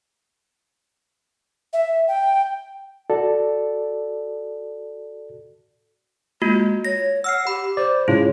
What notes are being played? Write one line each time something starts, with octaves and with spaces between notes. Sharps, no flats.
E5
G5
F#4 A4 D5
G#3 A#3 F4 F#4
C#5 A#6
F#5 E6 F6 C7
G4 B5
C5 D5
G#2 C#3 E4 F4 C#5